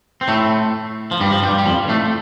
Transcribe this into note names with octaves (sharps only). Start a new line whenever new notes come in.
C4
A2 A3
F3
G2 G3
F3
G2 G3
G3
F2 F3
A2 A3